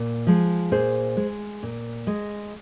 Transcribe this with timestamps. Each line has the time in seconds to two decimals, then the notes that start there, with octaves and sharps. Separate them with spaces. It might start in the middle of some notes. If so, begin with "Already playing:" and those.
Already playing: A#2
0.27 F3 G#3
0.72 A#2 G#4 C5
1.17 G#3
1.63 A#2
2.07 G#3